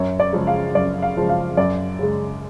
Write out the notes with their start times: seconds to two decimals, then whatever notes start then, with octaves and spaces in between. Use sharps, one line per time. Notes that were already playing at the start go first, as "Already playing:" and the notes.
Already playing: F#2 C#5
0.20 D5
0.33 C#3 F3 G#3
0.47 F5
0.75 F#2 D5
1.02 F5
1.17 C#3 F3 G#3
1.29 F5
1.57 F#2 D5
1.99 C#3 G#3